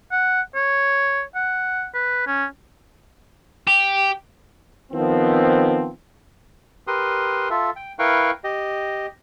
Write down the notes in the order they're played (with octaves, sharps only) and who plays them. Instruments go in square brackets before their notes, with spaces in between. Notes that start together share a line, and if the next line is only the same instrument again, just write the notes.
[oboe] F#5
C#5
F#5
B4
C#4
[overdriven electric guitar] G4
[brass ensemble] D#3 F3 B3 C4
[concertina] G4 A#4 B4 C6 D#6
F4 A4 E5
G5
E4 A#4 B4 F5 G5 C#6
G4 D#5